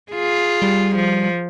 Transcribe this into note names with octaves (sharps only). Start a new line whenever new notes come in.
F4 G#4
G3
F3